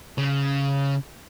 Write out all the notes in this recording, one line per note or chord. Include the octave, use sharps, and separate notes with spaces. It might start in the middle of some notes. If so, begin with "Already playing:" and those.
C#3